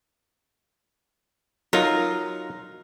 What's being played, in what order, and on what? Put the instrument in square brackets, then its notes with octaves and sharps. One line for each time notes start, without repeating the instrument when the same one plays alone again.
[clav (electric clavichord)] F#3 D#4 F4 [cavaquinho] A#4